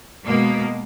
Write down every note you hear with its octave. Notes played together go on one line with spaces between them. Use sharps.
B2 G#3 A#3